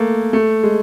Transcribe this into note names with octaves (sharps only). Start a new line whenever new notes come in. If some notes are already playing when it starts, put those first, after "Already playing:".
Already playing: A3 A#3
A3
G#3